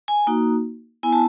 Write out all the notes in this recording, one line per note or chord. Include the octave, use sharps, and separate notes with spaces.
G#5
A#3 D#4 F#4
B3 E4 G#5
A5